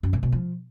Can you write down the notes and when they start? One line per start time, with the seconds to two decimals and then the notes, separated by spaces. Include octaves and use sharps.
0.03 F#2
0.13 A#2
0.23 B2
0.32 F3